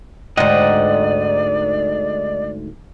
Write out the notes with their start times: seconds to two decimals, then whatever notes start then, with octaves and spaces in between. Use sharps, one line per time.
0.37 D2 G#2 D5 D#5 F#5 G5